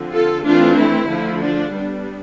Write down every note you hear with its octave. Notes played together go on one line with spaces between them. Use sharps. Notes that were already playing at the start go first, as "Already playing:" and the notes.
Already playing: D3 F3 C4
F4 A4
E3 A3 C4 D4 F4
E4
D3 F3 A3
D4
G3 B3 D4